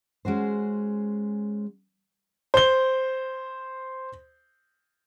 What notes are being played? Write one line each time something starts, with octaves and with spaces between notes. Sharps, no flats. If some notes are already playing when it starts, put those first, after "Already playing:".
G#3 C#4 F#4 C5
C5 G7